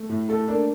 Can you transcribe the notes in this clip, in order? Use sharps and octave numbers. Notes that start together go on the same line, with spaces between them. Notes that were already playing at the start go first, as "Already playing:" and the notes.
Already playing: A3
A2
A3 A4
A#3 D4